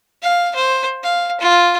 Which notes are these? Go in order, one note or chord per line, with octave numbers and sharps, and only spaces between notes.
F5
C5
F5
F4